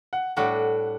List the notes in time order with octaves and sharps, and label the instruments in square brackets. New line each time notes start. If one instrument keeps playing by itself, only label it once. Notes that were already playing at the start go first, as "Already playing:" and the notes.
[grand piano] F#5
[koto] A2 G3 D4 F#4 [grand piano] F#5